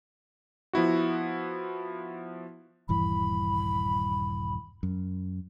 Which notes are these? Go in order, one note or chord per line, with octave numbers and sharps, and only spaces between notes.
F3 B3 E4 F#4
D#1 G2 E3 B5
F#2